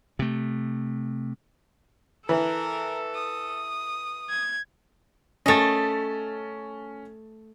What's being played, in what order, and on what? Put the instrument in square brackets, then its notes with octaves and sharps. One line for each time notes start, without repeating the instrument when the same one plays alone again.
[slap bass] C3 A3
[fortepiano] E3 [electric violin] A4 [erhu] A#4
[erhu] D#6
[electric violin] G#6
[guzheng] A3 D#5 [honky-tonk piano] C#4 A6